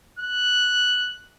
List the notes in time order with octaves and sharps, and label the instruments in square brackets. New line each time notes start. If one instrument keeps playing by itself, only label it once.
[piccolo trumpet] F#6